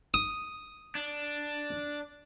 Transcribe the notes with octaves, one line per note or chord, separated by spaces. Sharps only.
D#6
D4